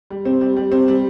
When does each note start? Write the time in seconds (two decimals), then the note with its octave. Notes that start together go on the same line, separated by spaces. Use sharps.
0.10 G3
0.25 C4
0.41 G3
0.56 G3
0.72 C4
0.88 G3